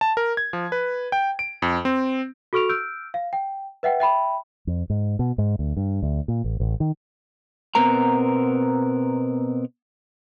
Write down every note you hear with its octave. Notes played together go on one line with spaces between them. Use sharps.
A5
A#4
G#6
F3
B4
G5
D7
F2
C4
F#4 A4 C#6 F6 D7 F7
E6 F6 G6 D7
F5
G5
B4 E5 F#5 G5
E5 G5 B5
F2
G#2
B2
G#2
D2
G2
D2
A#2
A1
A1
D#3
B2 B3 C4 A#4 A#5